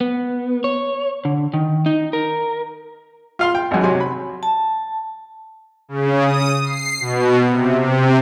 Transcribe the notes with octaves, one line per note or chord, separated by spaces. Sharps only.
B3
C#5
D3
D#3
D#4
A#4
F4 F5 C6
G5
G#1 F#2
C3 F#3 G#5
B5
A5
C#3
D#6
C7
B2
C3
C3